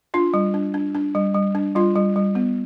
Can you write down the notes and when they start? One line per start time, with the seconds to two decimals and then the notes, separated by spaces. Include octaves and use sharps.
0.14 D4 F4
0.34 G3
0.54 D4
0.74 D4
0.95 D4
1.15 G3
1.34 G3
1.55 D4
1.75 G3 F4
1.96 G3
2.16 G3
2.35 B3